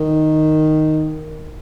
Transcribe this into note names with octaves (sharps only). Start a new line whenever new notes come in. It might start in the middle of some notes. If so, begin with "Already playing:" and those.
Already playing: D#3